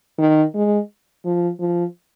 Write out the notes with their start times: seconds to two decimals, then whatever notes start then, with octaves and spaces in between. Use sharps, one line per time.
0.18 D#3
0.54 G#3
1.25 F3
1.60 F3